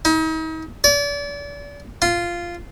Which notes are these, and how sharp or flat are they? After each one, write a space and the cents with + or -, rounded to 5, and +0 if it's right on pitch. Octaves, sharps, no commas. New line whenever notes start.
D#4 +40
D5 -35
F4 -10